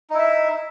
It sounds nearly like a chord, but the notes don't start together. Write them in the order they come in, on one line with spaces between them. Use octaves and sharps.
D#4 E4 E5